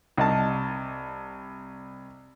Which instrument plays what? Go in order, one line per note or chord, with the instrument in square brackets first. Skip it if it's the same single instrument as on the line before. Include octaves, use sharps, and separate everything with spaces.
[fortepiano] C2 D#5 A5